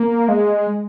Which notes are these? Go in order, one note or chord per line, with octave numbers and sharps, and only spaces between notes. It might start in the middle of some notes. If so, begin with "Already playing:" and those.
Already playing: A#3
G#3